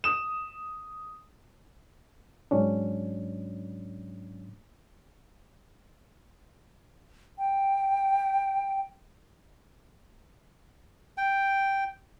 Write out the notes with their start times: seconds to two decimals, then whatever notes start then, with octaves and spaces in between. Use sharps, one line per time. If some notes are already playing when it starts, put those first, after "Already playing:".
0.04 D#6 E7
2.51 G#2 F#3 C#4 D4
7.38 G5
11.17 G5